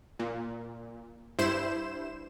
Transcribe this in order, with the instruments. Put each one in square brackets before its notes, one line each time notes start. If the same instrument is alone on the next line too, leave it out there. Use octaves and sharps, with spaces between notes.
[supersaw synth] A#2
G2 E4 C5 E7